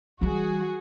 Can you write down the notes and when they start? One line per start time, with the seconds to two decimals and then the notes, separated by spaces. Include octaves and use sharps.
0.21 E3 G3 F#4 G#4